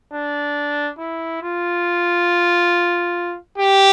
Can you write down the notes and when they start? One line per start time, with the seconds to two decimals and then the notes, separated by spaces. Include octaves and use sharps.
0.14 D4
0.99 E4
1.43 F4
3.58 G4